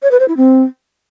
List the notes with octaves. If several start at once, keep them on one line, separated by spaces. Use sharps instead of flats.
C#5
B4
C5
E4
C4